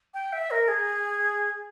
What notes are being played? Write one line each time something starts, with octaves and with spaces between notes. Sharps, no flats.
G5
E5
A#4
G#4